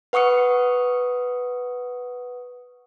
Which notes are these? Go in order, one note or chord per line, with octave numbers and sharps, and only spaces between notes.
B4 F#5 C#6 D#6 C#7